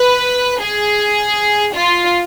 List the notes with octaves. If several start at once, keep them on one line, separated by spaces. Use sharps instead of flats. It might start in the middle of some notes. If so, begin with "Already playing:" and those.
Already playing: B4
G#4
F4